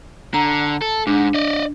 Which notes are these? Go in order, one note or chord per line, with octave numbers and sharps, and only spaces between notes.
D3 A#5
A4
G#2 D4
D5 D#5